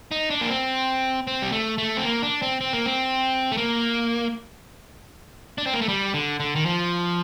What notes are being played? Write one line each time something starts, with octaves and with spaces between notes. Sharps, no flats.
D#4
D4
A#3
C4
C4
G3
A3
A3
C4
A#3
D4
C4
C4
A#3
C4
A3
A#3
D4
C4
A#3
A3
G3
D3
D3
D#3
F3